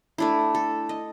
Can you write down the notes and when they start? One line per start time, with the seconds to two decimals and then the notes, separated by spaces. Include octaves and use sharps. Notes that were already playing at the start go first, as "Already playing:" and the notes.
0.18 A3 D4 E4
0.55 A4
0.89 D#5